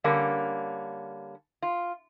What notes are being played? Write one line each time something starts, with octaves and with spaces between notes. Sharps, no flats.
D3 G3 A#3 C#4
F4